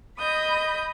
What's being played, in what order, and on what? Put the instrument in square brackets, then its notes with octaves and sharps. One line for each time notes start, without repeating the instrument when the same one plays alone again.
[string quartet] D#5 B5 D#6 G6